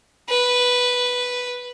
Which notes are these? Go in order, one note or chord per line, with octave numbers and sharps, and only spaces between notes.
B4